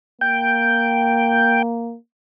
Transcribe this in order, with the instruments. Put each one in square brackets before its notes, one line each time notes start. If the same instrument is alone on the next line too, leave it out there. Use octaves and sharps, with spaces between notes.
[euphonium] A#3 [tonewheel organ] G5